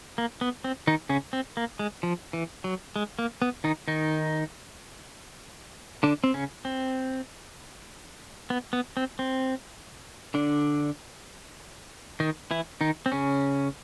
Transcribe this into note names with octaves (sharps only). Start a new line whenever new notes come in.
A#3
B3
C4
D#3 D#4
C#3 C#4
C4
A#3
G#3
F3
E3
F#3
G#3
A#3
B3
D#3 D#4
D#3 D#4
D3 D4
C4
C#3 C#4
C4
B3
B3
C4
C4
D3 D4
D#3 D#4
E3 E4
D#3 D#4
C4
C#3 C#4